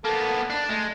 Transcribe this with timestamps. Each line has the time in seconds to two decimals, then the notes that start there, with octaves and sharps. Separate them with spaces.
0.05 A#3 B3 A4
0.50 D4
0.69 G#3 A3